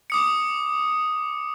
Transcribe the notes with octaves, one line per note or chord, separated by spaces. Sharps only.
D6 D#6 C#7